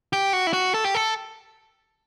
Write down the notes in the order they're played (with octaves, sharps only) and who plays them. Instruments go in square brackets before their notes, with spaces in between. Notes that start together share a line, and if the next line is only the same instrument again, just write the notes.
[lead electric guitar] G4
F#4
E4
F#4
A4
G4
A4